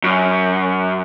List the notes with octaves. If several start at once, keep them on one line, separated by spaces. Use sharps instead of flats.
F#2